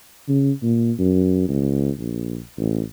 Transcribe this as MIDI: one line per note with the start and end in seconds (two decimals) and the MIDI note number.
0.29 0.52 49
0.63 0.92 46
0.99 1.45 42
1.49 1.91 37
1.99 2.39 34
2.58 2.82 33